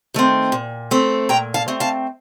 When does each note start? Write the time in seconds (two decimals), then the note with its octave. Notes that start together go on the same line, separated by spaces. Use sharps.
0.14 D#3 A3 C4
0.52 A#2
0.91 A3 C4
1.29 A#2 G5 A#5
1.54 F5 A5
1.68 A3 C4
1.80 F5 A5